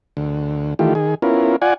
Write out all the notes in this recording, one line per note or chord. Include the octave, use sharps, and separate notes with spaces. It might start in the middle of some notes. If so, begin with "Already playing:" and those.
D2
D#3 E3 A3 F4 G4
D#3 G#4
B3 C#4 E4 F4 A#4
F4 D5 F#5 G#5